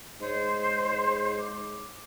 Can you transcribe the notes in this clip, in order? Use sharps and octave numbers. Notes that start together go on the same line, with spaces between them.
G#2 G#4 C5 C#5 D#5
D6